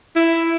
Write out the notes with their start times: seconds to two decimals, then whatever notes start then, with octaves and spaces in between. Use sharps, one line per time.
0.16 E4